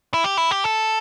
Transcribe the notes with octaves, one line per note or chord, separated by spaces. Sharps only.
E4
G4
E4
G4
A4